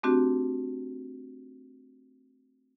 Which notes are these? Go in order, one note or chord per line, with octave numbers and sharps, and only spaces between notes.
A3 C4 D4 F#4 G4